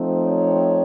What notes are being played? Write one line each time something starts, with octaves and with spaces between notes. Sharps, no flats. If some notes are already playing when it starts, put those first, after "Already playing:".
Already playing: F3 A3 C4 D#4
C#5